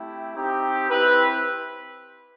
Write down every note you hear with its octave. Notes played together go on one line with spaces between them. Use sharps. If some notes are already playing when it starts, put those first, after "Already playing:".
Already playing: A3 C4 E4 G4
C4 D#4 G4
C4 E4 G4 B4